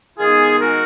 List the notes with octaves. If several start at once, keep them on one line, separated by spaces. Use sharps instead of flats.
D#3 G#3 B3 D#4 F4 G#4
F#4 A#4